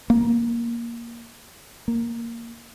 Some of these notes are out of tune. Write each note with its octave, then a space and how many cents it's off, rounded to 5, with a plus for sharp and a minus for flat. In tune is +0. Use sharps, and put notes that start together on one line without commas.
A#3 +10
A#3 -5